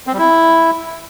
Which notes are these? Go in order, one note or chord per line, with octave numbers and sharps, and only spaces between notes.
C4
G3
E4